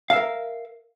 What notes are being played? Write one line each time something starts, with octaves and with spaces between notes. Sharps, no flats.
A#4 E5 F5